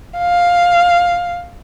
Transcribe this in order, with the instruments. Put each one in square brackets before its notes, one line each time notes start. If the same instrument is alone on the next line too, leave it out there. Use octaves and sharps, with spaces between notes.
[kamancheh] F5